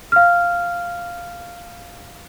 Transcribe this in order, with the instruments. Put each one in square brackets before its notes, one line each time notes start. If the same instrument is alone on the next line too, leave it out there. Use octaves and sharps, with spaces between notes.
[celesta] F5 F6